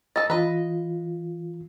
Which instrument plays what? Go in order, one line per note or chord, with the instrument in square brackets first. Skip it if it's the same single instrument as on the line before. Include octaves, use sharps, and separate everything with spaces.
[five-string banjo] A4 D#5 [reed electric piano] A6
[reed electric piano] E3 F4 [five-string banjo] B4 D#5